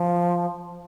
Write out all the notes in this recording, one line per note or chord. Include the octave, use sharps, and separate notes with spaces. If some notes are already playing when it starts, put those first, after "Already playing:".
Already playing: F3